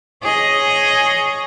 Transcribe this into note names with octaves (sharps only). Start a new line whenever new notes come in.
G#4 C#5 D#5